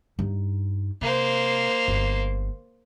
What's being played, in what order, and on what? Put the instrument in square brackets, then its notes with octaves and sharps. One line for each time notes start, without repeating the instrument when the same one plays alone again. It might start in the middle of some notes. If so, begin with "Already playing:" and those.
[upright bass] G2 D#4
[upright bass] C3 [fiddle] A#3 C5
[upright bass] G1 D4